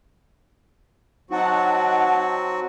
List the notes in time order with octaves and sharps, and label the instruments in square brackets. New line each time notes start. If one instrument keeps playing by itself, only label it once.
[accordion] F#3 C4 F#4 [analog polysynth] D#4 F#5 A5